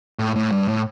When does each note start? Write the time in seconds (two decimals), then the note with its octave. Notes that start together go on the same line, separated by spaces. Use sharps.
0.19 A2
0.36 A2
0.52 G2
0.68 A2